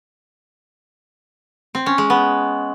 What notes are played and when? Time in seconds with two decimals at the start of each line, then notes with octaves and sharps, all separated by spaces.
1.75 C4
1.86 C#4
1.98 G#3
2.10 B3